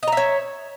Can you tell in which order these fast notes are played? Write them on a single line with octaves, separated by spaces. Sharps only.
D#5 A#5 E5 C#5